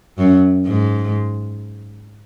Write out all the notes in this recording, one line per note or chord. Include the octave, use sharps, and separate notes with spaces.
F#2
G#2